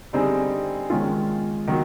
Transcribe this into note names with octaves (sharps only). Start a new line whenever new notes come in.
D3 G3 C4 D#4 G#4
D#3 G#3 C#4 F4
D#3 F#3